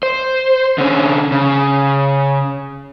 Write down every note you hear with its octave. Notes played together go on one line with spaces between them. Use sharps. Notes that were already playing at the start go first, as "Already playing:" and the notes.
C5
D3 C#4
C#3